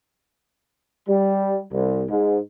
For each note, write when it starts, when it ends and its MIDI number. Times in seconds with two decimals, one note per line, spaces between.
1.09 1.61 55
1.72 2.04 36
2.10 2.38 44